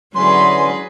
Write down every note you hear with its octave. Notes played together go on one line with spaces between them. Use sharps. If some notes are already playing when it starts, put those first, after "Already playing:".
D3 E3 F#3 C#4 G#4 B4 C6